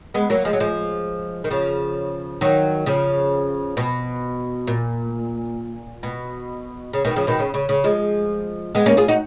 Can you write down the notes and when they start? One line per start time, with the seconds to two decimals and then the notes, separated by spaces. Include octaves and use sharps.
0.14 G#3 B3
0.30 F#3 A#3
0.45 F3 G#3
0.53 F#3
0.60 F3 G#3
1.44 D#3
1.51 C#3 F3
2.41 D#3 F#3
2.86 C#3 F3
3.77 B2
4.67 A#2
6.03 B2
6.93 C#3
7.05 B2 D#3
7.16 C#3 F3
7.27 B2 D#3
7.39 C#3
7.54 C#3
7.69 C#3
7.84 F3 G#3
8.75 G#3 B3
8.86 A#3 C#4
8.97 F4 G#4
9.08 D#4 F#4